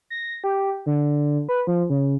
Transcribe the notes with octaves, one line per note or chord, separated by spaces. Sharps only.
A#6
G4
D3
B4
F3
C#3